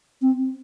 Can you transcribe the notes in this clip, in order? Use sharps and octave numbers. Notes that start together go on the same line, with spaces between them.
C4